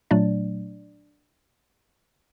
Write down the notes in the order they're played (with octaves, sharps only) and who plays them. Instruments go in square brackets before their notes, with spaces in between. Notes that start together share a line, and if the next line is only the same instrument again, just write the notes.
[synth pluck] A#2 F#3 A3 D4 D5